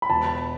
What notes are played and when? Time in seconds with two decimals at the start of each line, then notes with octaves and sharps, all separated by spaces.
0.02 B5
0.10 E1 A5